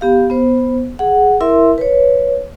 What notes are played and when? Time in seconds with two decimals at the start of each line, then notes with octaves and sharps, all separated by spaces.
0.01 B3 G4 F5
0.30 B3 C5
0.99 G#4 F#5
1.41 E4 A#4 E5 C6
1.78 B4 C#5